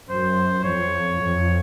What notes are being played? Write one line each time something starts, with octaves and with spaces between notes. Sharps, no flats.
F#2 C5
F2 C#5
F2